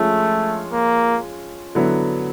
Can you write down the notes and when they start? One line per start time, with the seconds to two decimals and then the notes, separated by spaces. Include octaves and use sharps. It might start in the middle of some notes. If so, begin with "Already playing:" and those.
Already playing: F3 G#3 A3 C#4 F4
0.73 A#3
1.75 D3 F#3 B3 E4